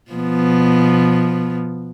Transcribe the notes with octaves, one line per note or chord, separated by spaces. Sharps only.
B2 F3 B3